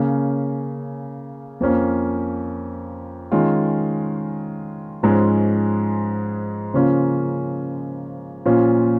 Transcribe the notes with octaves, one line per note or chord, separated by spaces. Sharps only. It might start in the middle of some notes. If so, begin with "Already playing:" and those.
Already playing: C#3 A#3 C#4
F2 F3 A#3 C#4
D#3 G#3 C#4 F4
G#2 F3 G#3 C#4
C#3 F3 A#3 C#4 F4
A#2 F3 C#4 F4